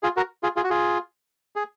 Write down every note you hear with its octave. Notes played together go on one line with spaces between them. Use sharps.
F4 G#4
F#4 A#4
F4 G#4
F4 G#4
F#4
F4 G#4
G#4